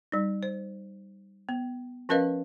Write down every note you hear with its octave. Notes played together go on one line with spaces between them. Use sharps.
G3 D#4
C5
B3
F3 C#4 A#4 B4 D#5 F5